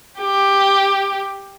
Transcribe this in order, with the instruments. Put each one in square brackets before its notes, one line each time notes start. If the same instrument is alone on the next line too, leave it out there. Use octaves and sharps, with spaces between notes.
[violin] G4